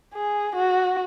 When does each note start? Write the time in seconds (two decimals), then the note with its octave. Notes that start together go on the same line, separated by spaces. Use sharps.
0.14 G#4
0.56 F#4